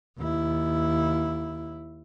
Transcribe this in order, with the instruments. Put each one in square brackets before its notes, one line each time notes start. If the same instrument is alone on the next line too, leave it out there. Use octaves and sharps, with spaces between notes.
[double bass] D#2 E4